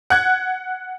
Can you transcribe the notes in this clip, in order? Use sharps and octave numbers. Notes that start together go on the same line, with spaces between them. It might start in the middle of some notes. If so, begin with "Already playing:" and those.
F#5 F#6 G#6